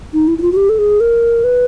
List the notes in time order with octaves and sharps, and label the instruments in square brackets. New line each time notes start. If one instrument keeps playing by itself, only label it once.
[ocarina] D#4
E4
E4
F4
F#4
G4
A4
G#4
A#4
B4